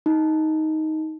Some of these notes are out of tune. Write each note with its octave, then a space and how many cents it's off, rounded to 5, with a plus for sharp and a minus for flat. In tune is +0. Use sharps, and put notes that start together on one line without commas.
D#4 +10